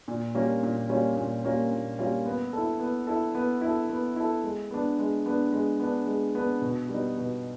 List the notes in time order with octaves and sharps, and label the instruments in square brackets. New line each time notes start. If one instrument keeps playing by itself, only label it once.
[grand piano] A#2
G3 A#3 C#4 F4
A#2
G3 A#3 C#4 F4
A#2
G3 A#3 C#4 F4
A#2
G3 A#3 C#4 F4
B3
E4 A4
B3
E4 A4
B3
E4 A4
B3
E4 A4
G#3
B3 D4
G#3
B3 D4
G#3
B3 D4
G#3
B3 D4
B2
G3 B3 D#4
B2